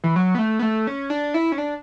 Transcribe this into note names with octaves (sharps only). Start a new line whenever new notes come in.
E3
F#3
B3
A3
B3
A3
C#4
D4
E4
C#4
D4